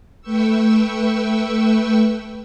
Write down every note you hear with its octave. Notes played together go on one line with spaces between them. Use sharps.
A3 B4 G5 C#6 E6